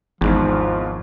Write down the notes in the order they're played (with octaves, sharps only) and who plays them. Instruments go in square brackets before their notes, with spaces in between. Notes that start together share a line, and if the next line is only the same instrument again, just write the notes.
[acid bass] G#1 [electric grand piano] E2 G#2 [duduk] F3